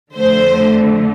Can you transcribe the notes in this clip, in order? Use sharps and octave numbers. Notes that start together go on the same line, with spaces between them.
F2 D3 A3 C5